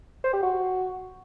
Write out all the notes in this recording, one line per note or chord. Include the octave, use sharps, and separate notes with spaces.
C5
G4
F#4